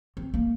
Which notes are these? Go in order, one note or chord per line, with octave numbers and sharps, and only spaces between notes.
C4
A#3